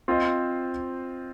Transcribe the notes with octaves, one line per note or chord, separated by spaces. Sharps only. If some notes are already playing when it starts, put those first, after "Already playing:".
C4 F4 C5 D#5